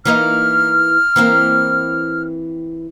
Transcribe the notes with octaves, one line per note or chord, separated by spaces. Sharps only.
E3 A#3 D#4 F6
E3 A#3 C4